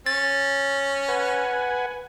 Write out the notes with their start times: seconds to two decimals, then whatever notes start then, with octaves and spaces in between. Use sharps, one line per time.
0.06 C#4 A6
1.08 B4 F#5 G#5